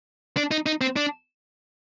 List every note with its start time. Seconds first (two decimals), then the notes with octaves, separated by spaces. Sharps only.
0.37 D4
0.51 D#4
0.66 D#4
0.81 C4
0.96 D4